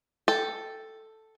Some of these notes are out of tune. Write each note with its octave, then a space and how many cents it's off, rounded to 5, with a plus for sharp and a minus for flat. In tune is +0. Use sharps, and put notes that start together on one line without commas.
A4 +0 G5 +0